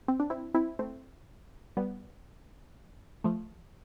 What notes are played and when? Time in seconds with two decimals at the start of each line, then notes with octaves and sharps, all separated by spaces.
0.08 C4
0.20 D4
0.30 C4 E4
0.54 C4 E4
0.79 A3 C4
1.77 G3 B3
3.24 F3 A3